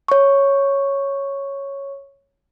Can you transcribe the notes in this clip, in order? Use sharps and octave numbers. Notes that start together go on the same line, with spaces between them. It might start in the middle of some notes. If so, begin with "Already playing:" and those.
C#5 C#6